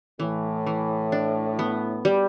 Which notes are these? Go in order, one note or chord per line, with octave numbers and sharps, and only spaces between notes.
A2 E3
E3
D4
B3
G3